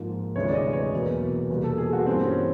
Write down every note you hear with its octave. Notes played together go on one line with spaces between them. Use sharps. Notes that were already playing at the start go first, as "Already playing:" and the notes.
Already playing: G#2 F3 A#3
D2 C3 E3 G#3 C#5
D5
D#5
C#5
E2 B2 F#3 A#3
E2 B2 G3 A#3
A4
G#4
F#4
G2 E3 G3 A#3 C4
C#4